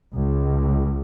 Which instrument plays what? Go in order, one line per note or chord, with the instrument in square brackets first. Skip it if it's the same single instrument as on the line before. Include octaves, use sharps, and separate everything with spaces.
[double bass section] C#2